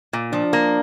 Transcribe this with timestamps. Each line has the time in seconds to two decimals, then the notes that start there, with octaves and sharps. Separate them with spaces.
0.13 A#2
0.33 F3 D4
0.53 A#3